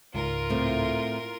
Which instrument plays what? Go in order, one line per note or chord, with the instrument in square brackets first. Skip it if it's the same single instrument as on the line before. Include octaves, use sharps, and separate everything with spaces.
[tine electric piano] C#2 G#2 [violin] F4 A#4
[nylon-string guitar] A2 A3 C4